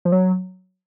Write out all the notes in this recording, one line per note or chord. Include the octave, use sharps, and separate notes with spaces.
F3
F#3